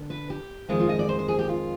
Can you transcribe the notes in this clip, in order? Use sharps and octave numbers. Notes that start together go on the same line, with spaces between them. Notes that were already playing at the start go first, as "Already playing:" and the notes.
Already playing: D3 B3 D4
B4
G4
F2 D#3 G#3 F4
F4
D#5
D5
C5
C5
G#4
G4
F4